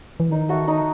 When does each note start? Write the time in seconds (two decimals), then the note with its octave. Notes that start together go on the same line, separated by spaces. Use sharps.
0.20 E3
0.30 D#3 D#4
0.49 F#4 A4 E5
0.67 D#4